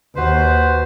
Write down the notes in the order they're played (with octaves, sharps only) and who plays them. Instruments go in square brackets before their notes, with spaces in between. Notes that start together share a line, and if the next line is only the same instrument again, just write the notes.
[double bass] D#2 [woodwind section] F#4 B4 C5